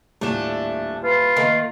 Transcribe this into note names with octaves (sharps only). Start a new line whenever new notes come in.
D#1 A2 A3 D4 E7
F4 B4
D#3 A3 A#3